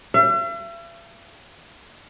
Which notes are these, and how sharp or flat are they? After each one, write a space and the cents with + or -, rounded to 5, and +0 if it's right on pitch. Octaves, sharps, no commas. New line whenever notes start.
E5 +45